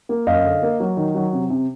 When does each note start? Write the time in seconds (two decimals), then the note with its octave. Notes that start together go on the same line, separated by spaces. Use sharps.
0.09 A#3
0.27 F#2 D#5 F5
0.45 D3
0.62 A#3
0.80 F#3
0.97 D#3
1.15 F#3
1.33 C3
1.50 C3